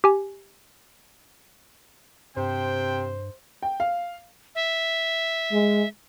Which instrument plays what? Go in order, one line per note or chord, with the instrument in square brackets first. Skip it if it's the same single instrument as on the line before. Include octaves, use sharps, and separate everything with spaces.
[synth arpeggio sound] G4 G#5
[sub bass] G2 [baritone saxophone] C3 [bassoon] C5 [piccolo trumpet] G5
[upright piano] G5
F5
[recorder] E5
[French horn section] G#3